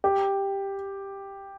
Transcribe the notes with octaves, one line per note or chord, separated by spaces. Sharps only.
G4